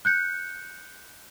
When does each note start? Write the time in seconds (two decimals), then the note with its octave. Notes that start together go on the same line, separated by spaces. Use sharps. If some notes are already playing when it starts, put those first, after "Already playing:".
0.05 F#6 G6 C#7